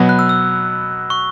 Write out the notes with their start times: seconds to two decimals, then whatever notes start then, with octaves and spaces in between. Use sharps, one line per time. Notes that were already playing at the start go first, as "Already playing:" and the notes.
Already playing: B2 F#3 B3
0.09 F#6
0.19 E6
0.29 E6
1.10 C#6